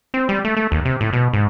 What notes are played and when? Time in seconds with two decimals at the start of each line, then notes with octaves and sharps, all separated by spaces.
0.14 C4
0.29 G3
0.45 A3
0.57 A3
0.72 D#2
0.85 C3
1.01 A2
1.13 B2
1.33 G#2